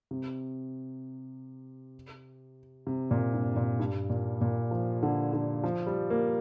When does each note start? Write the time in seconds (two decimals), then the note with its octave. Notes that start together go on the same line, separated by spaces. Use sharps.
0.11 C3
2.87 C3
3.11 A#2
3.33 G2
3.56 A#2
3.79 G2
4.10 A#2
4.41 A#2
4.71 F3
5.03 D3
5.33 D3
5.64 F3
5.87 G3
6.10 A#3